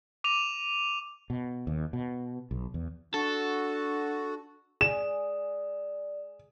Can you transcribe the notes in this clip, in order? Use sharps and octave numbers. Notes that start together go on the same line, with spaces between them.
D6 D#7 F7
B2
D#2
B2
B1
E2
D4 F#4 A4
G#4 D5 E7